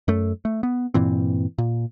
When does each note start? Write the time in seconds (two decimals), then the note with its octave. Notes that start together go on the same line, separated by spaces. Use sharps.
0.08 F#2 A3
0.45 A3
0.63 B3
0.94 G2 A#2 E3 C4
1.58 A#2